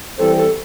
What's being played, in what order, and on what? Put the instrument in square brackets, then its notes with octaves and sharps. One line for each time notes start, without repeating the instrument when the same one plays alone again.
[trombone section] E3 G3 C4 [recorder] A4
[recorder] A4